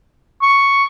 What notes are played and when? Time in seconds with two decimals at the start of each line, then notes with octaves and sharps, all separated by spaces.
0.42 C#6